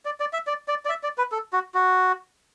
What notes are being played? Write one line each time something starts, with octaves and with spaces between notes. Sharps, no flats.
D5
D5
E5
D5
D5
D5
E5
D5
B4
A4
F#4
F#4